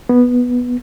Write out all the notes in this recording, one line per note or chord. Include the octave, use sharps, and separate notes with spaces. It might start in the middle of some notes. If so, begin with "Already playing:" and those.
B3